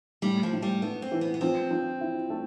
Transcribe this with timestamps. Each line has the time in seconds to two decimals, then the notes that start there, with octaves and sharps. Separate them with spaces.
0.22 A2 G3
0.43 F3
0.53 A2
0.62 G3
0.82 A3 B3
1.02 C4
1.12 E3
1.21 B3
1.34 B3
1.41 F3 C4
1.71 F3
2.01 E4
2.30 A3